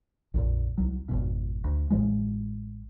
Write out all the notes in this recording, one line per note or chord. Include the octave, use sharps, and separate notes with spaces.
A#1 F2 A#2
C2 F#3
G#1 F2 B2
D2
A1 A2 F3 G#3